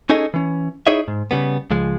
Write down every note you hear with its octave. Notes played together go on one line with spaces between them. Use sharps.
C#4 D#4 G#4 A4 D#5
E3 C#4
D#4 E4 G#4 C#5 D#5 E5
G#2
C#3 G3 B3
C#2 F3 G#3